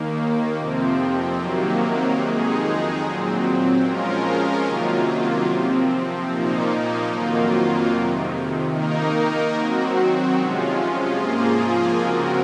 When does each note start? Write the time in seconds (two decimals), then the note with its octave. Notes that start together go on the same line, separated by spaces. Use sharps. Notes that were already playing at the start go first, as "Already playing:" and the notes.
Already playing: D#2 D#3 A#3
0.56 F2 C3 F3 C4
1.38 C3 D#3 F#3 A#3
2.20 F2 D#3 G#3 D#4 G#4
3.01 A#2 F#3 C4
3.82 F3 G#3 C#4 F4 A#4
4.64 C3 D#3 F#3 A#3 F4
5.45 C3 F3 C4
6.27 A#2 F3 A#3 D#4
7.09 F2 D#3 F#3 A#3 F4
7.90 F2 C3 D#3
8.72 D#3 A#3 D#4 A#4
9.54 D#3 F#3 C4 F#4
10.35 C3 F3 G#3 C#4 F4
11.16 G#2 F3 A#3 F4 G#4
11.98 C#3 F3 C4 F#4 A#4